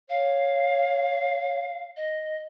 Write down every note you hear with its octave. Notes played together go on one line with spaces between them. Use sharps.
C#5 F5
D#5